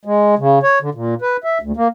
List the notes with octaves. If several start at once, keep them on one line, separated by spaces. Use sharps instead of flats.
G#3
C#3
C#5
D3
A#2
B4
E5
D2
A#3